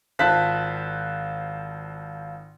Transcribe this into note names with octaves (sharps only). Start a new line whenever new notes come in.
G#1 F4 C5 A5 F#6 B6